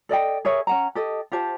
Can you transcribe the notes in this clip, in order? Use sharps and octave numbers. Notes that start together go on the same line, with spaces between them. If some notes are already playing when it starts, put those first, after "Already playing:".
A4 D5 D#5 G5
G#4 A#4 C#5 E5
C#4 F#5 A#5
G4 A4 D#5
F4 G4 C5 A5